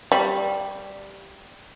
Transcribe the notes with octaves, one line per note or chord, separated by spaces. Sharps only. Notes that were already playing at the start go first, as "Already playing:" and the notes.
G3